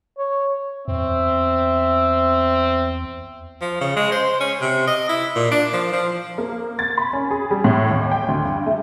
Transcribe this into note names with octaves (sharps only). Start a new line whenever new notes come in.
C#5
E2 C4 E5
F3
C#3
G#3
C5
C#4
C3
D#5
E4
A#2
D4
F3
F3
A#3
A6
B5
C#4
G#4
G3
A2
D#2
G5
D2
G2
A3